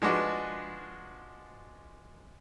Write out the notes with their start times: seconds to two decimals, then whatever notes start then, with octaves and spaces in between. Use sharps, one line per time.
0.02 F3 G#3 D4 F#4 B4